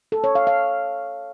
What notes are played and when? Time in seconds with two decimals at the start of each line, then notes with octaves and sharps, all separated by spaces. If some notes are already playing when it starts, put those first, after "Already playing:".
0.12 A4
0.24 C#5
0.35 F5
0.47 F5